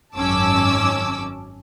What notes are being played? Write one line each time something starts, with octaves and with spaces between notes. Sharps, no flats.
G#1 F#2 C#4 A5 D6 E6